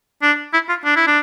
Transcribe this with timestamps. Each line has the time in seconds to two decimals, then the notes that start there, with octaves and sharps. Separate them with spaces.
0.22 D4
0.53 E4
0.69 F4
0.85 D4
0.96 E4
1.07 D4